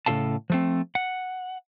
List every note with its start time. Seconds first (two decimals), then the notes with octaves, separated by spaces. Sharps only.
0.06 A2 C#3 F4 A4 F5 A5
0.50 F3 A3 C4
0.95 F#5